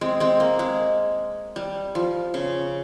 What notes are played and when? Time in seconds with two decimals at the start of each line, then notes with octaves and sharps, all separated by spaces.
0.01 G#3 C4
0.20 G#3 C4
0.40 A#3
0.59 G#3
1.56 G3
1.95 F3
2.34 C#3